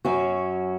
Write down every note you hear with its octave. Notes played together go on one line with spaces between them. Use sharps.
F#2 F#3 C#4 F#4